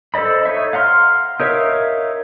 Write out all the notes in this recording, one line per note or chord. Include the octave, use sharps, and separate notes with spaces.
A4 C5 D5 D#5 B5
D#4 C#5 E5
F5 F#5 A#5 C6 F6
D#4 A#4 C#5 E5 F5